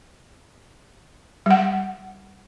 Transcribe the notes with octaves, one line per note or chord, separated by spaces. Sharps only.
G3 F#5